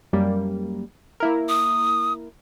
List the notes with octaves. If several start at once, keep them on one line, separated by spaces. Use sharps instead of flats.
F#2 G3 A#3
A#3 E4 A#4
D#6